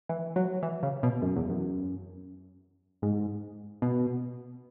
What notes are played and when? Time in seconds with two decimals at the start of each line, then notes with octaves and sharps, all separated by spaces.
0.09 E3
0.36 F#3
0.63 E3
0.83 C#3
1.03 B2
1.22 F#2
1.36 E2
1.49 F#2
3.02 G#2
3.82 B2